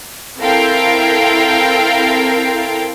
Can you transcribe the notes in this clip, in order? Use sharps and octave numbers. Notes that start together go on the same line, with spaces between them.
C4 E4 A4 A#4 F5 G5